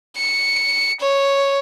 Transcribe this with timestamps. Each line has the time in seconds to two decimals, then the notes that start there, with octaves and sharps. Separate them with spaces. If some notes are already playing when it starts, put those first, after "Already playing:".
0.17 C#7
1.01 C#5